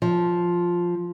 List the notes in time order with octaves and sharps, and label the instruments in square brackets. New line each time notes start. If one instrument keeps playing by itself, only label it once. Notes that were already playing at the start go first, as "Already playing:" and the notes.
[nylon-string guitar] F3